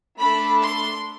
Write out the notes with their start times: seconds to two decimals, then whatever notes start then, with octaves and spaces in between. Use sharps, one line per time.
0.18 A3 D4 A4 B5
0.63 C6